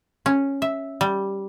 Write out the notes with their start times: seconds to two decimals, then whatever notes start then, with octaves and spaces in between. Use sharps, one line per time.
0.26 C#4
0.62 E5
1.01 G3